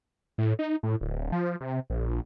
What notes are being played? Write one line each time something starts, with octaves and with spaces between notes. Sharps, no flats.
A2
D#4
A2
D1
F3
C3
A#1